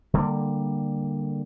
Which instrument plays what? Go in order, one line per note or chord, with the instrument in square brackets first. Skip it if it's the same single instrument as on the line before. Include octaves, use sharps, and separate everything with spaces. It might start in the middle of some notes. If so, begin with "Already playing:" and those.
[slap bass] D3 G3 A#3